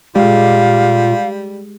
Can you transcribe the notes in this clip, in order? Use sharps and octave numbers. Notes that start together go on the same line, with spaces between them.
A#2 G3 G#3 F4 G4 F5